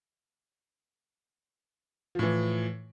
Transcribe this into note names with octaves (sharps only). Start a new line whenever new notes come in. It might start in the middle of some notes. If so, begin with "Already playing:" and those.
A2 E3 F3